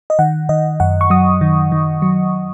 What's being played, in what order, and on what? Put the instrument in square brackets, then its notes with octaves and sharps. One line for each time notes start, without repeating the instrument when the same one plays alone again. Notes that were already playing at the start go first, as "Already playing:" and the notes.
[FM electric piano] D#5
D#3 F#5
D#3 D#5
F#2 F#5
C#6
F#3 D#6
D#3
D#3
F#3